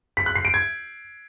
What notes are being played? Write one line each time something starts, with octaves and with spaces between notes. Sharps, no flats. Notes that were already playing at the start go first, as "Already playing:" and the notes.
B6
F#6
C7
D7
G#6